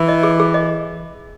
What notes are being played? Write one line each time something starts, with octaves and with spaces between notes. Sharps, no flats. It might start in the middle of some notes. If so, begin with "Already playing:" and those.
Already playing: E3
D#5
G#4
G#4
D#5